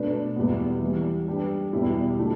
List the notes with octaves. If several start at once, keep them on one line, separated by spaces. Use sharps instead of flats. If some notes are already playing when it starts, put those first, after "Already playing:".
Already playing: B2 A3 D4 B4
E2 B2 G3 B3
E3 G3 B3
G3 D4 G4 B4
E2 B2 G3 E4 G4
D3 A3 E4